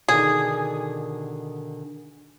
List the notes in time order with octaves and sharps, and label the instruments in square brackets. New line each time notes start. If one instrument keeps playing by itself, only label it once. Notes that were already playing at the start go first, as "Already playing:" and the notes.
[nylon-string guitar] B2 D3 D#3 [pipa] G#4